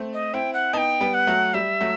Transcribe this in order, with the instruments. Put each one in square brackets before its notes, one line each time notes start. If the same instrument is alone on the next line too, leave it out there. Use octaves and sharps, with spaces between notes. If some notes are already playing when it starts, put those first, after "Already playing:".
Already playing: [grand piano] A3 C4
[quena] D#5
[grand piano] C4 E4 [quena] G5
[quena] F#5
[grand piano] B3 D#4 [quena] A5
[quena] G5
[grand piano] G3 B3
[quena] F#5
[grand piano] F#3 A3
[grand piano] G3 [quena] E5
[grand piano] F#3 A3